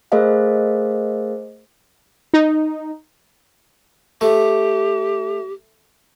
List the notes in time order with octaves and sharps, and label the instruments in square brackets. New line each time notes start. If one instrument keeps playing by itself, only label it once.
[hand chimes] A3 G#4 A#4 C5 D#5 F5
[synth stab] D#4
[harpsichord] A3 [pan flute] G4